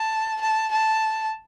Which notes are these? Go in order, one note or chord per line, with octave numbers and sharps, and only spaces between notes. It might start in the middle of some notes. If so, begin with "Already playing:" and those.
Already playing: A5
A5
A5